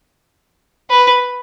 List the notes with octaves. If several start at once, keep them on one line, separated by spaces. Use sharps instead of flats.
B4